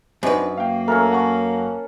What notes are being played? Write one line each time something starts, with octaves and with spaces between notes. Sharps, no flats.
F#2 C4 D4 D#4 B4
A#3 F5 G5
A3 C#4 A4 A#4
F#5 A#5 C#6